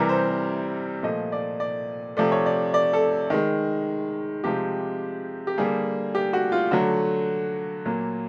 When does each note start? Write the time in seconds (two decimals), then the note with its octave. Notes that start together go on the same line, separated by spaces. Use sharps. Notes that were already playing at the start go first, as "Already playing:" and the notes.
Already playing: C3 E3 G3 A#4
0.09 C5
0.28 C5
1.03 A#2 F3 A3 D#5
1.32 D5
1.60 D5
2.17 C3 F3 A3 D5
2.32 C#5
2.46 D5
2.74 D5
2.93 A4
3.30 D#3 G#3
4.44 C3 F3 G#3 G4
5.47 G4
5.58 D3 G3 A#3 G#4
6.15 G4
6.33 F#4
6.52 F4
6.71 D3 F#3 A3 F#4
7.85 A#2 F#3 A#3